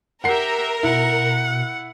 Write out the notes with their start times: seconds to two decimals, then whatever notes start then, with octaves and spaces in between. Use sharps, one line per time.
0.24 G4 A#4 E5 F#5 C7
0.83 B2 E4 F#5